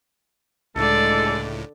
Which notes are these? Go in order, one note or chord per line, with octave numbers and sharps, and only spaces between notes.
C#2 A2 D3 G#3 A4 D5